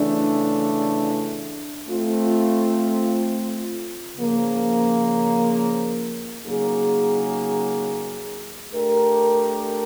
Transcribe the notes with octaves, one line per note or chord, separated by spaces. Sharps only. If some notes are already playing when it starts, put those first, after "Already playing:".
Already playing: C#3 E3 A3 D4
A3 C4 F4
C#3 F3 A#3
C#3 F#3 A#3 D#4 G#4
A3 D4 G4 A#4